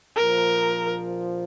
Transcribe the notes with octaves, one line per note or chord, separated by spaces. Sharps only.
A#1 A#2 F3 A#4